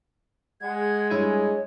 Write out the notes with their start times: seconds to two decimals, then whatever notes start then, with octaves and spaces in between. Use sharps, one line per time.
0.61 G#3 F#5 G#6
1.10 G2 E4 C#5 G#5